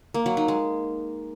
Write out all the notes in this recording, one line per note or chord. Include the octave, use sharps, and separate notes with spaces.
A#3
F#3
D#4
G#3